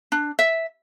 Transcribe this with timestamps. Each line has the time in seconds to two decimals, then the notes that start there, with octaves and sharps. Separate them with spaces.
0.12 D4
0.39 E5